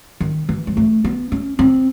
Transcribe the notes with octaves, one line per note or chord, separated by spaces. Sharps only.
D#3
E3
G#3
A3
B3
C#4
C4